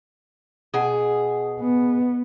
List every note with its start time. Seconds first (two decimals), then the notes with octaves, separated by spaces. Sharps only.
0.74 B2 G#4
1.61 B3